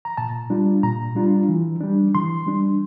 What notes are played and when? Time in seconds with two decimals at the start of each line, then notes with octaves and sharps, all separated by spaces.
0.05 A#5
0.17 A#2 A5
0.50 G3 D4 F4
0.83 A#2 A#5
1.15 G3 D4 F4
1.49 E3
1.81 G3 D4
2.15 E3 C6
2.47 G3 D4